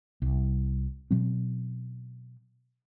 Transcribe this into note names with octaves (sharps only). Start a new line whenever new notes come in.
C2
B2 F#3 C4